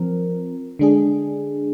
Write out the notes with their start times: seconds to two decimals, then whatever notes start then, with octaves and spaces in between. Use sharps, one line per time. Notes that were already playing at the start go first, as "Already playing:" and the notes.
Already playing: F3 C4 A#4
0.79 D3 G#3 D4 G#4